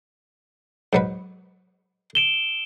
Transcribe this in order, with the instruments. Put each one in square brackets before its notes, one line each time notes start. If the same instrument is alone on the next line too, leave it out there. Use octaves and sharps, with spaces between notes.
[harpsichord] G#2 F#3 B4
[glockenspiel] D7 E7 G7